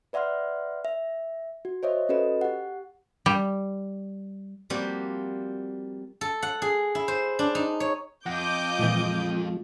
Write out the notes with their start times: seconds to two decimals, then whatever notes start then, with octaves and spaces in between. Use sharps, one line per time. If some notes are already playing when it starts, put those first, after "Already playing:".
0.13 B4 D5 E5 F#5 C6 F6
0.85 E5
1.65 F#4
1.83 C5 C#5 D#5 E5
2.09 C#4 F#4 A4 B4 D#5
2.41 G4 F#5
3.26 G3
4.70 F3 G3 A#3 C4 F#4 G4
6.21 A4
6.42 F#5
6.62 G#4
6.95 E4
7.08 C5
7.39 D4
7.55 D#4
7.80 C#5
8.26 F2 D#5 F#5 D6 G6 A#6
8.79 A#2 E3 F3 G#3 F4